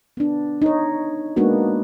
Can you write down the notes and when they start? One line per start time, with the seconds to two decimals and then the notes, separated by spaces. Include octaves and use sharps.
0.17 B3 D4
0.62 D#4 C#5
1.36 G#3 A#3 B3 D4 D#4 F#4